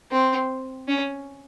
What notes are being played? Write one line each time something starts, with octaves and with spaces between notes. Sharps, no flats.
C4
C#4